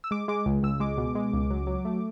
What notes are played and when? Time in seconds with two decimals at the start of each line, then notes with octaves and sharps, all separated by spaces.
0.04 E6
0.11 G#3 D6
0.28 G#3 D6
0.46 C#2
0.63 C#2 E6
0.80 G#3 D6
0.98 B2
1.15 G#3
1.33 C#2
1.50 F#3
1.67 F#3
1.85 A3